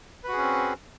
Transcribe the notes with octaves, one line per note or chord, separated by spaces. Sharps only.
C4 C#4 F#4 G#4 B4